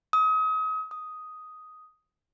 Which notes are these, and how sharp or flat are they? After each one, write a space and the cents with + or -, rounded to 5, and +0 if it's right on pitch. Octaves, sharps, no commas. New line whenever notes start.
D#6 +35
D#6 +5